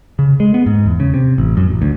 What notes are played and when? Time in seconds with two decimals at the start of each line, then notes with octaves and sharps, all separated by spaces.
0.19 C#3
0.40 G#3
0.54 B3
0.66 G#2
0.86 E2
1.00 C#3
1.14 C3
1.38 A1
1.57 F#2
1.70 A1
1.82 D2